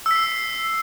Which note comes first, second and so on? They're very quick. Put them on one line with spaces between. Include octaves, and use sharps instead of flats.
E6 B6 C7